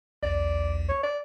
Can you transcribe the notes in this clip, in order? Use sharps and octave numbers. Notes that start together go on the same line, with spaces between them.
B1 E2 D5
C#5
D5